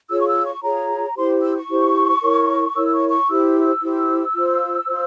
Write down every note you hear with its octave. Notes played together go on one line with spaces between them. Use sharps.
F4 G#4 C#5 E6
C#6
E6
C#6
F4 G#4 C#5 A#5
E4 G4 C5 C6
E6
C#6
E4 G4 C5
E4 A#4 C#5
E4 A#4 C#5 E6
C#6
C#6
E4 G4 C5 E6
E4 G4 C5
F4 C5
F4 C5